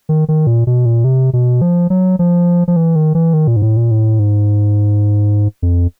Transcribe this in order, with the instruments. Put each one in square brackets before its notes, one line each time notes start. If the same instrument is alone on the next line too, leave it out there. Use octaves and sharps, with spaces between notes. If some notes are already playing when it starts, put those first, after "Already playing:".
[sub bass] D#3
D#3
A#2
B2
A#2
C3
B2
F3
F#3
F3
F3
E3
D#3
E3
D#3
A#2
G#2
A2
A#2
A2
G#2
F2